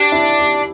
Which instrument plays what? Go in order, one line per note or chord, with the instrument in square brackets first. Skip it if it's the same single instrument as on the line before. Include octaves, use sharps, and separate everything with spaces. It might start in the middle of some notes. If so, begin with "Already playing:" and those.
Already playing: [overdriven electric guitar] D4 [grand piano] G4
[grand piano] E4
G4